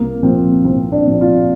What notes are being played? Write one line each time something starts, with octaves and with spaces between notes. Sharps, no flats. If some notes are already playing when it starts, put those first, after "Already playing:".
Already playing: C2 A#3
A#2 F3 C4
C2 C4
D4
A#2 F3
F4